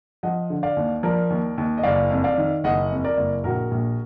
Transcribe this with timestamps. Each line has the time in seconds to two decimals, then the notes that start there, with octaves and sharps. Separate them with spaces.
0.23 F3 D#5 F#5
0.50 D3
0.63 D5 F5
0.77 D#2
1.03 F3 A#4 D5
1.30 D#2
1.58 D#2
1.77 D#5
1.83 F#1 D5 F5
2.11 F2
2.24 D5 F5
2.38 D#3
2.64 F#1 D#5 F#5
2.91 F2
3.04 A#4 D5
3.17 F#1
3.44 A#1 F#4 A#4
3.71 A#1